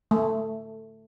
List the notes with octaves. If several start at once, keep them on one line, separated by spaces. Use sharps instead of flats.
A3